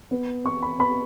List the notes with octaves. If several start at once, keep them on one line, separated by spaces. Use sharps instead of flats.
B3
B3 C#6
B5
B3 B5